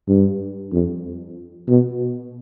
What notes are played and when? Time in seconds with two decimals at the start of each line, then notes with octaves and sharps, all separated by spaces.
0.08 G2
0.73 F2
1.68 B2